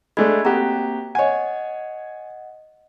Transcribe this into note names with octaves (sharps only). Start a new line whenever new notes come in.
G#3 A3 D4 B5 G#6
A#3 C4 F#4 G4 A#5
C#5 D#5 F#5 G#5